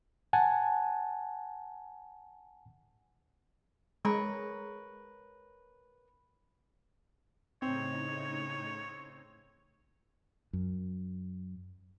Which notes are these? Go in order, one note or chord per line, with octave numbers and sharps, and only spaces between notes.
F#5 G#5 A5
G#3 A#4 B4 C#5
A2 C#3 C4 D#4 C#5
F#2